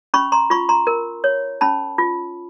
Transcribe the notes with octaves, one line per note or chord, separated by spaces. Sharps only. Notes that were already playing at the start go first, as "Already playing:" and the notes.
C#4 B5 C#6
A#5 C6
F4 B5 C#6
A#5 C6
A#4
C#5
C#4 A5 B5
F4